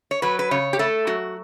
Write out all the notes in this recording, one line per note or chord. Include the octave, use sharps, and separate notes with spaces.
C#5
F#3 B4
B4
C#3 C#5
G4
A3 A4
F#3 F#4